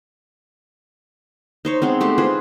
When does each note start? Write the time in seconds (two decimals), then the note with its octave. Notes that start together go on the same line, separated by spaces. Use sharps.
1.65 D#4 C5 C#5
1.82 G#3 B3 C4
2.01 G#3 A3 G4
2.18 F4 G#4 B4 C5